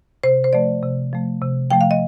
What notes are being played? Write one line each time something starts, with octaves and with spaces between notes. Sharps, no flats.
C3 C5
C5
F3 A3 D5
C3
F3 A3
C3
F3 A3 G5
F5
D#5